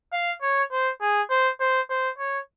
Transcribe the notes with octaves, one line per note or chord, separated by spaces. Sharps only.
F5
C#5
C5
G#4
C5
C5
C5
C#5